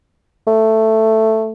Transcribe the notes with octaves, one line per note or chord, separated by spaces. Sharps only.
A3